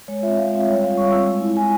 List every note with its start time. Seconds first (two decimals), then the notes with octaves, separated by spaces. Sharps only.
0.08 G#3 C#5
0.23 C4 F4 E5
0.38 G#3 F5
0.53 C4 F4 E5
0.67 G3 C#5
0.83 C4 F4 F5
0.97 G3 C#6
1.12 C4 F4 E6
1.27 G#3
1.42 E4
1.57 G#3 G#5